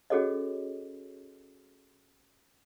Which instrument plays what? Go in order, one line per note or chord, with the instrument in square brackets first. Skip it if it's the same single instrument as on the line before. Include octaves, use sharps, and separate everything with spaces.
[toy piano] C#4 F#4 G#4 A4 C#5 D#5